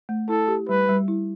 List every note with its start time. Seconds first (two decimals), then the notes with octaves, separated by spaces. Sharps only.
0.09 A3
0.28 E4 A4
0.48 G4
0.69 G3 B4
0.89 G3
1.08 E4